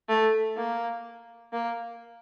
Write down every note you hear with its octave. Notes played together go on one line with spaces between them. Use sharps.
A3
A#3
A#3